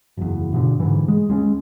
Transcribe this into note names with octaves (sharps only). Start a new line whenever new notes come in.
F#1 E2
G2 B2 D3
G#2 D3 E3
G#3
D#2 G#3 C#4